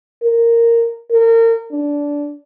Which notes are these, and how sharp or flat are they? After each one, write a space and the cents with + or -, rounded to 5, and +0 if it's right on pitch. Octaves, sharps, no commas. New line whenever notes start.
A#4 -10
A#4 -30
D4 -15